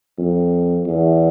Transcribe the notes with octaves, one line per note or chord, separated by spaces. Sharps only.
F2
E2